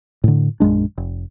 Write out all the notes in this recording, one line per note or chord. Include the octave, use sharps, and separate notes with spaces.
A2 D3
A#1 F#2 G#3 D4
F1